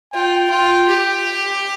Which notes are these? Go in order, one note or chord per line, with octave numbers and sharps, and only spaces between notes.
F4 G5
F4
G4